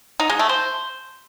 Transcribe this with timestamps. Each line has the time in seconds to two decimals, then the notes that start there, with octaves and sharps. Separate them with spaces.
0.20 D#4
0.29 G#3
0.39 A3
0.49 C5